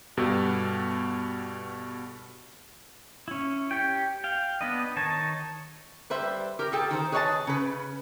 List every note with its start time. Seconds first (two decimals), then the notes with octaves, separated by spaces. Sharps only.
0.17 G2 B2 G4 A4 B4
3.28 C#4 E4
3.71 G4 C#5 G5
4.24 F5 G5
4.61 B3 D4 B4 D#5
4.96 D#3 D#4 C#5 A5
6.10 G3 B4 C5 E5
6.59 G4 A#4
6.72 G#4 A4 G5
6.91 D#3 C5
7.12 G#4 B4 C#5 D#5 G#5 A5
7.47 C#3 B4